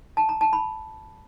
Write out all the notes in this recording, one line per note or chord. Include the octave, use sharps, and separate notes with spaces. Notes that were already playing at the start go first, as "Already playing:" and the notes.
A5
A#5
A5
B5